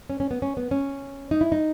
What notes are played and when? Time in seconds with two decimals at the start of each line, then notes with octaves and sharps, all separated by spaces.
0.10 C#4
0.20 C#4
0.31 B3
0.42 C#4
0.57 B3
0.71 C#4
1.31 D#4
1.41 E4
1.52 D#4